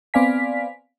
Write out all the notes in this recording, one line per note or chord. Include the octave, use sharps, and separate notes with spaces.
B3 C4 D5 F5 G#5 B6